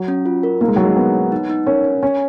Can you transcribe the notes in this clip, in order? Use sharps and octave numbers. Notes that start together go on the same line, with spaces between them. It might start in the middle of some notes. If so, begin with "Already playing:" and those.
Already playing: F#3
C#4
F4
A#4
A#3 D#4
G#3
F#3 D#4
G#3
B3 A#4
C#5
D#4
D#4
C#4 A#4
C#5
C#4 G#5